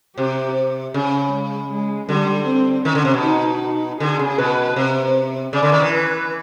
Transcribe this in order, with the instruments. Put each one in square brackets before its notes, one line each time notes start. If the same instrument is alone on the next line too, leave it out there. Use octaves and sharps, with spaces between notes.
[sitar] C3 [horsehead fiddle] G4
[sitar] C#3 [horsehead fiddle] C#4
[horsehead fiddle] G#3
G#3
[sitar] D3 [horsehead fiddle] G3
[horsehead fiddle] C4
[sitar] D#3 [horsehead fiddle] C#4
[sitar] D3
C3
B2
[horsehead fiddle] D#4
D#4
[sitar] D3 [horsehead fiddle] G#4
[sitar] C#3
[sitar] B2 [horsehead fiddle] B4
[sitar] C3
[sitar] C#3 [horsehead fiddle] D5
[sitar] D3
D#3
E3
[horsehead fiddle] B4